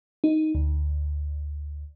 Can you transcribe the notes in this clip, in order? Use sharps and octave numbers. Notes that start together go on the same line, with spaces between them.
D#4
D2